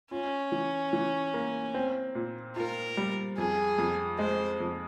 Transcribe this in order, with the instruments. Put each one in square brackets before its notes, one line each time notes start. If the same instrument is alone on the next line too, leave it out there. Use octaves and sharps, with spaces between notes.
[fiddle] C#4 [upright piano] F4
[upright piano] E3
E3
A#3
C4
A#2
[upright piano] F4 [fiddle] A#4
[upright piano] G3
[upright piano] F2 [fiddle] G#4
[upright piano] F2
[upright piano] G#3 [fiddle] C5
[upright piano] F2